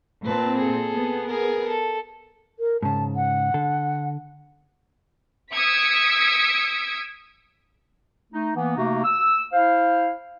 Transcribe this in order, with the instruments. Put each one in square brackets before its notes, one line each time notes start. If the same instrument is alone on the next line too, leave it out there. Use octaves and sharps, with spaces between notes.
[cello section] A#2 C4 [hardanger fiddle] B4 A5
[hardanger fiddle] G#4 A4
[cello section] B3
[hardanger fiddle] G#4 A#4
A4
[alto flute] A#4
[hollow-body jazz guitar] G#2 C#3 [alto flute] A5
[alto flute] F#5
[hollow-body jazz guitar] D3 A4
[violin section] D#6 E6 G#6 B6 C#7 D7
[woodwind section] A3 D#4
E3 A#3 B3
C3 A3 A#3 D#4 F#4
E6
E4 C5 F5